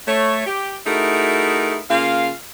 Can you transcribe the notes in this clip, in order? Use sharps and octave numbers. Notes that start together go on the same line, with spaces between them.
A3 C#5
G4
A3 D#4 E4 F#4 G#4 A#4
C#3 A#3 F4 F5